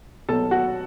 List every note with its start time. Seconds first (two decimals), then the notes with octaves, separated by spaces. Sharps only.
0.28 B2 F#3 A4 A5
0.51 F#4 F#5